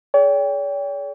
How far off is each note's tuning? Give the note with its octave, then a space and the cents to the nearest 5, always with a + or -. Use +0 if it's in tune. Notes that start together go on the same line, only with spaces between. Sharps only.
G#4 +30 C#5 +45 G5 +15